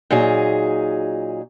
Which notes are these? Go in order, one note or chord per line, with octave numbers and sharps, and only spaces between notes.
A#2 F#3 D#4 G#4